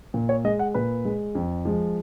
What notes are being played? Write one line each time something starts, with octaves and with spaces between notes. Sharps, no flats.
A#2
C#5
G#3 D#5
F#5
A#2 B4
G#3
F2
F3 G#3